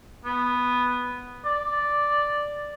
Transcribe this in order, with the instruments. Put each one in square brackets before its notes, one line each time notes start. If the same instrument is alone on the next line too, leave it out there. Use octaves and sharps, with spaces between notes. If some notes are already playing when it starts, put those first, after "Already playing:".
[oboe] B3
D5